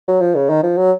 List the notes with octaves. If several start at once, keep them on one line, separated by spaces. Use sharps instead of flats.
F#3
F3
C#3
D#3
F3
F#3